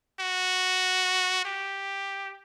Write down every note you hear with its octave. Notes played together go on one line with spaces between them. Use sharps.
F#4
G4